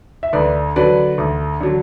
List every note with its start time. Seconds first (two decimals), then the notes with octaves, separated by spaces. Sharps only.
0.23 E5
0.33 D2 B4 D5
0.76 D3 F#3 B4 D5
1.18 D2
1.60 D3 F#3